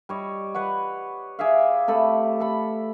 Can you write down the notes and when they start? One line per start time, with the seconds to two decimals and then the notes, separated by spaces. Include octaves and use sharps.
0.09 G3 C#5 D#5
0.54 B4 C#5 F#5
1.39 G#4 D5 E5 F5
1.88 C3 A3 A4 B5
2.40 A4 B5